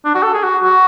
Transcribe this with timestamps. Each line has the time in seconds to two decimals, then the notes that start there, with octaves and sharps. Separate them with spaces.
0.04 D4
0.14 F#4
0.23 A4
0.34 G#4
0.43 F#4
0.63 F#4